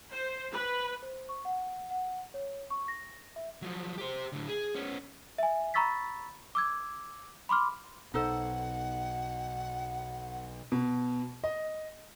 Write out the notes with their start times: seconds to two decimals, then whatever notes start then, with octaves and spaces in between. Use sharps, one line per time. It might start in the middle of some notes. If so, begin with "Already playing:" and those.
0.11 C5
0.51 B4
1.03 C5
1.29 C#6
1.45 F#5
1.91 F#5
2.34 C#5
2.70 C#6
2.88 A#6
3.36 E5
3.62 F3 F#3
3.98 G4 C5
4.32 A2 D3
4.47 G#4
4.75 B3 C#4
5.38 E5 G#5
5.74 A#5 B5 C#6 E6 A6 B6
6.55 D6 E6 G#6
7.49 B5 C6 D6 F6
8.14 B1 B2 D#4 A4 C5 F#5
10.72 B2
11.44 D#5